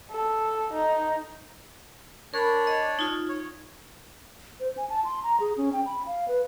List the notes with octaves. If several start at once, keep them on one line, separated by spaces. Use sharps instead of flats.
A4
D#4
D4 A#4 C#5 D5 B5
D#5
D#4 F4
C#5
C5
G#5
A5
C6
A#5
G#4
C#4
G5
B5
F5
B4